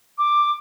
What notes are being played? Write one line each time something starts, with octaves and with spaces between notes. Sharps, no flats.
D6